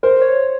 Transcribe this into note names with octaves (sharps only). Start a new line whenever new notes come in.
A#4 C5
C#5